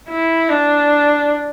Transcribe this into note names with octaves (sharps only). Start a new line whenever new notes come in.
E4
D4